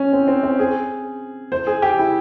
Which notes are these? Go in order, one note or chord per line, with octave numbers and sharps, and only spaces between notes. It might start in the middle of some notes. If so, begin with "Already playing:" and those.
Already playing: C#4
C4
C4
C4
G#4
C5
G#4
G4
E4